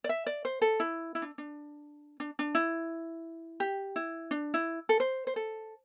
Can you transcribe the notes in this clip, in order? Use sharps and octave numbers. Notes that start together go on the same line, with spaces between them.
D5
E5
D5
C5
A4
E4
E4
D4
D4
D4
D4
E4
G4
E4
D4
E4
A4
C5
C5
A4